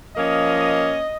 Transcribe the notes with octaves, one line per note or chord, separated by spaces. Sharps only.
F3 A#3 C#4 D#5